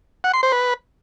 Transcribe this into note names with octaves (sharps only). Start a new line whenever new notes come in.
F#5
C6
C5
B4